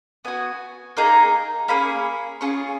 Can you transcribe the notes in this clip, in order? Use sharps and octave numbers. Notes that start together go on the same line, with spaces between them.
B3 F#4 G#5
A#3 D#4 G#4
A#3 C#4 G#4 B5
C#4 F4 G#4 C#6